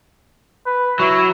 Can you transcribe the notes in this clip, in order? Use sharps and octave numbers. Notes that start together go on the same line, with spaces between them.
B4
F#3 E4